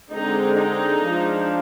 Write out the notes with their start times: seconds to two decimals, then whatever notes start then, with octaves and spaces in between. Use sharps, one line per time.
0.11 D3 G#3 C4 D#4
0.57 D#4
1.04 F3 G#3 D4